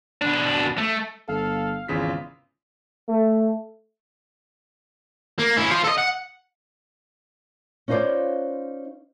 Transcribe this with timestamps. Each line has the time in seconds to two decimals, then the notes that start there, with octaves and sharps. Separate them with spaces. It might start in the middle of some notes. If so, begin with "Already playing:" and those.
0.22 B2 D4
0.78 A3
1.28 G1 A4 F5
1.88 G#1 E2 C#3 F4 B6
3.08 A3
5.39 A#3
5.57 C#4 E4
5.71 F4 C5
5.84 A4 D#5
5.98 F#5
7.88 C#4 D#4 F4 B4 C5 D5